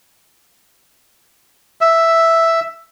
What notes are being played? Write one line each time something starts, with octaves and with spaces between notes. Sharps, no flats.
E5